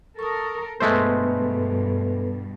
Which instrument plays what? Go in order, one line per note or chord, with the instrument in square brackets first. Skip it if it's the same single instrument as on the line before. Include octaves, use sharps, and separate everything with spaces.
[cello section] A4 A#4 [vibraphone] C#6 D#6
[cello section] G2 B2 [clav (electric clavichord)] G#3 A3 C5 [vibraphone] B3 A4 B4